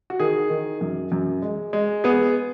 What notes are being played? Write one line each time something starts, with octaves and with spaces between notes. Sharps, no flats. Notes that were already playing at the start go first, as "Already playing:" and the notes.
F#4
D#3 G#4
D#3
F#2
F#2
G#3
G#3
B3 G#4